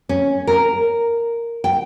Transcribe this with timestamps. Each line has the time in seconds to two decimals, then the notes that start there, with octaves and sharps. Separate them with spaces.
0.09 C#4
0.47 A#4
1.64 G5